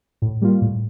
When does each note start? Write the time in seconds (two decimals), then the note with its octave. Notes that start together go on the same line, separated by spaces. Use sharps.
0.22 A2
0.42 G3 A#3 F4
0.62 A2